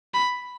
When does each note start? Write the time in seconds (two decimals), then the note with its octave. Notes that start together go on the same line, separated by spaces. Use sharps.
0.14 B5